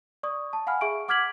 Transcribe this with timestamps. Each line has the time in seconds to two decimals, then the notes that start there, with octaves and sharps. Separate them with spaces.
0.23 D5 C#6 D#6
0.53 A5
0.67 F5 F#5 G#5 B5 F6
0.81 G#4 E5 C#6 D7
1.08 F#5 D6 F6 G#6 B6 F#7